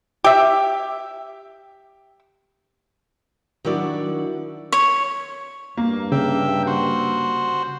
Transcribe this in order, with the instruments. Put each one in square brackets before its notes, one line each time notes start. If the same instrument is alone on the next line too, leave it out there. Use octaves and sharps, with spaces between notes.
[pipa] G4 E5
[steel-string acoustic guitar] D#3 F#3 D4 E4 F#4 D5
[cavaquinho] C#5
[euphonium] G2 [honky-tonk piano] A#3
[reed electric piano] C#3 [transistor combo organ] E5 G5
[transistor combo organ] F#4 C5